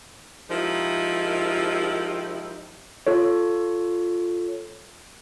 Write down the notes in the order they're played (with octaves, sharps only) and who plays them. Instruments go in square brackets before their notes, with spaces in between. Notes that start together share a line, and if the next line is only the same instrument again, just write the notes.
[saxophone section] F3 G#3 D#4 E4 G4 A#4
[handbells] F4 A4 C#5